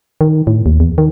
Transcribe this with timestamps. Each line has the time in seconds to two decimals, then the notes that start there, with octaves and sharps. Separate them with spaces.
0.21 D#3
0.47 A2
0.66 D#2
0.80 E2
0.98 D#3